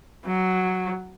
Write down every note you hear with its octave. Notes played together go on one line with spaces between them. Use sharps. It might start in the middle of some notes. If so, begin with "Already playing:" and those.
F#3